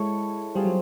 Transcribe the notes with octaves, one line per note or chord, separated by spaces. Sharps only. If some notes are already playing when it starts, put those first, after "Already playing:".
Already playing: G#3 E4 A4 C#5
G3 C4 F4 G#4 C5
F#3